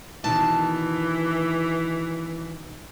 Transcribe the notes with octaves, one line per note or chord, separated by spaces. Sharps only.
B2 D#3 E3 A5